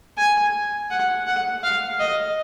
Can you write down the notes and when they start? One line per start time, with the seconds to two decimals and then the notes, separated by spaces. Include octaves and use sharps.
0.17 G#5
0.91 F#5
1.27 F#5
1.63 F5
2.00 D#5